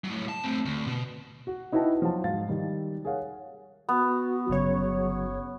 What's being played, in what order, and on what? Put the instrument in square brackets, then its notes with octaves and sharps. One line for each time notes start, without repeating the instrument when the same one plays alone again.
[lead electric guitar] A2 F#3
A5
A3 C4
D2
B2
[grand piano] F#4
D#4 E4 F#4 B4 G5 A5
F3 F#3 F4 A5
G#2 F5 A6
D#3 G3
G#4 A#4 C#5 F5 F#5
[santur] B3 [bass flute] F#4
[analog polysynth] G1 C#3 C#5 [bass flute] F#3